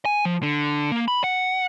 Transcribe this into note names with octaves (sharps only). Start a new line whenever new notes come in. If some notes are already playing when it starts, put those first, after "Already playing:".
G#5
F3
D3
A#3
B5
F#5